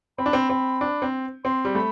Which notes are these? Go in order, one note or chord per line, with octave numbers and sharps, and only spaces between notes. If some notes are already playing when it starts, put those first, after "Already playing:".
C4 B5
D4
C4
C4
D4
C4
C4 C6
G3
A3 B5